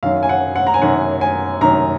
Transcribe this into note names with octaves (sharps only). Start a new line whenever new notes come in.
F#2 D#3 F#3 F5
G#5
F#5
F#5
A#5
G#5
F#2 D#3 F#3 F#5
G#5
F#2 D#3 F#3 A#5